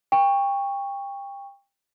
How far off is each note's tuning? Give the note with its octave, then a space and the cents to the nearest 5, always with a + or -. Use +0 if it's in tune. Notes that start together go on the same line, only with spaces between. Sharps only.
G5 +30 C#6 +0